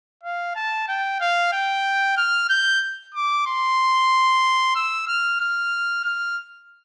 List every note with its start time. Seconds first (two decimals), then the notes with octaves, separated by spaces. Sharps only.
0.23 F5
0.55 A5
0.88 G5
1.20 F5
1.53 G5
2.17 F6
2.49 G6
3.14 D6
3.46 C6
4.75 E6
5.08 F6
5.40 F6
6.04 F6